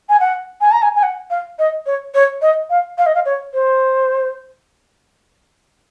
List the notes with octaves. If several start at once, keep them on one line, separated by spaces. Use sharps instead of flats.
G#5
F#5
G#5
A#5
G#5
G#5
F#5
F5
D#5
C#5
C#5
D#5
F5
F5
D#5
F5
C#5
C5